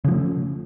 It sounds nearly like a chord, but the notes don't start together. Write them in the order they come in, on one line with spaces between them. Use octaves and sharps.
C#3 F3 A3